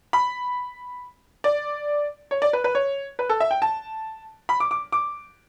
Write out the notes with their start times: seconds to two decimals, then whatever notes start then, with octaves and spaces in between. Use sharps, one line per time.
0.13 B5
1.44 D5
2.31 C#5
2.42 D5
2.53 B4
2.64 B4
2.75 C#5
3.19 B4
3.29 A4
3.40 E5
3.51 G5
3.62 A5
4.49 B5
4.60 D6
4.71 D6
4.92 D6